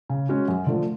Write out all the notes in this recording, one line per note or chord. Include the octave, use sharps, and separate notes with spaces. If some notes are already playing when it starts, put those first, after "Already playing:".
C#3
G#3 C#4 F#4
F#2
D3 F3 A3